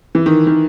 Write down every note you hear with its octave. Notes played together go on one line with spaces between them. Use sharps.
E3
D#3
D#3